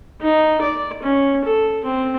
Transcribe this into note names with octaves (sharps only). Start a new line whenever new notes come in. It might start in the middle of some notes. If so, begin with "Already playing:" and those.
D#4
D5
C#4
A4
C4